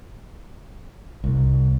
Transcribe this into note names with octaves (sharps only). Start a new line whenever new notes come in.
C2